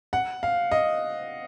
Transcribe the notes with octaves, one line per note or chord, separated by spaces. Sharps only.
F#5
F5
D#5